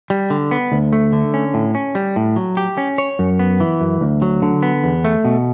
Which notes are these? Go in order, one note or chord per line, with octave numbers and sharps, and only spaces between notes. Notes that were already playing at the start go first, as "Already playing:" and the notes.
G3
D3
B3
D2
A3
D3
C#4
A2
C#4
G3
A2
F#3
G4
C#4
C#5
F#2
B3
E3
F#2
D2
F#3
D3
B3
E2
A3
B2